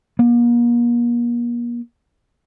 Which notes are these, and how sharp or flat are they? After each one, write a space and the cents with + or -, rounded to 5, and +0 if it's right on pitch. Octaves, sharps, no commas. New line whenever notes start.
A#3 +40